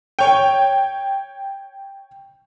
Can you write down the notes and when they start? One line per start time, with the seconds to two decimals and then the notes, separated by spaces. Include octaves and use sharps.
0.19 C#5 G5